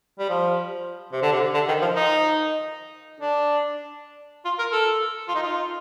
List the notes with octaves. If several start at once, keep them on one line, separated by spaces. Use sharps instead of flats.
G3
F3
C3
D3
C3
D3
D#3
F3
D#4
D4
F4
A#4
A4
F4
D#4
F4